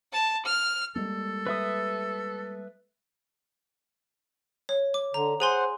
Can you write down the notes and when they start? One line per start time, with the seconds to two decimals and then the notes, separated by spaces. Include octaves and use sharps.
0.13 A5
0.45 F6
0.95 G3 G#3 A#3 A4
1.47 B4 E5 D#6
4.69 C#5
4.94 D6
5.14 D3 A#5
5.40 G#4 C5 F#5 G#5 C6